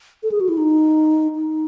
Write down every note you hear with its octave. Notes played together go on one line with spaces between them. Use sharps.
A4
G#4
F#4
E4
D#4
D#4